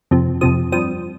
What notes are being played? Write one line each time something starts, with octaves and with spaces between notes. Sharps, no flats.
F2 C3 F3
F2 C3 F3 D#6
G2 F3 C4 D#6